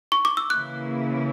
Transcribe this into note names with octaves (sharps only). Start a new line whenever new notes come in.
C#6
D6
E6
C#3 E3 A#3 E4 F#6